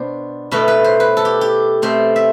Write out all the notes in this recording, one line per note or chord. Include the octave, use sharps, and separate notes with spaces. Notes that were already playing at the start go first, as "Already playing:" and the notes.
Already playing: B2 B3 D4 C5 D5
B2 A3 E4 B4
B4
C5
B4
A4
G4
G4
B2 A3 C4 C5
E5